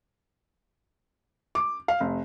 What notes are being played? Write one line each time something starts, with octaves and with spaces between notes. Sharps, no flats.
D6
F5
F1